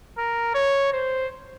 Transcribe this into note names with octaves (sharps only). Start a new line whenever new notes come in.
A#4
C#5
C5